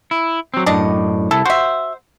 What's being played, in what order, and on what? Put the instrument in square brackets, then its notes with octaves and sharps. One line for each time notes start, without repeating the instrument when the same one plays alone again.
[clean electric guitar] E4
F#3 C4
[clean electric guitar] F#2 A2 [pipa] D4 D5 D#5
[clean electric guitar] C2 E4 [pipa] A4
[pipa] F#4 E5 [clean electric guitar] C5